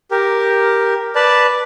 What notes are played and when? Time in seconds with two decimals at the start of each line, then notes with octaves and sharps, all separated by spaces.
0.11 G4 A#4
1.15 B4 D5 A5